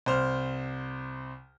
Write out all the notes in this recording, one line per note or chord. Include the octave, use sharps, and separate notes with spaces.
C2 C5 F6